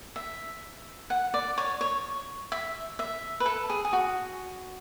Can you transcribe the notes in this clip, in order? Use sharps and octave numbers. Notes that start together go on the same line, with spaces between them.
E5
F#5
D5
C#5
C#5
E5
E5
B4
A4
G#4
G#4
F#4